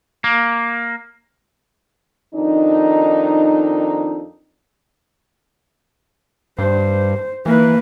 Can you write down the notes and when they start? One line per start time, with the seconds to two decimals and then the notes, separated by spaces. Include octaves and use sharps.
0.24 A#3
2.34 F2 D#3 D4 D#4
6.59 G2 C5
7.46 E3 A#3 B4